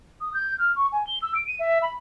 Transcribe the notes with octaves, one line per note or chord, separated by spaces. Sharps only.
D#6
G6
F6
C#6
G#5
G7
E6
D7
D#7
E5
B5